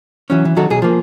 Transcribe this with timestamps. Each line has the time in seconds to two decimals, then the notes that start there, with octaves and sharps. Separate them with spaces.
0.30 E3 F#3 C#4
0.45 E3
0.56 D#3 F#3 F#4 A4
0.70 B1 G#4
0.82 F3 A#3